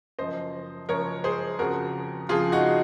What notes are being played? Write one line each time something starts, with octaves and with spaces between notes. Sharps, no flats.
F#1 F#2 F3 C5 D#5
F#1 F#2 F3 A#4 C#5
G#4 C5
F2 C#3 F3 F#4 A#4
F2 C#3 F3 F4 G#4
D#4 F#4